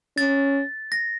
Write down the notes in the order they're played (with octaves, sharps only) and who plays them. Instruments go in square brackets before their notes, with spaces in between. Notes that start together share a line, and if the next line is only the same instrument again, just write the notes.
[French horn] C#4 [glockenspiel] A6
[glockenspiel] A#6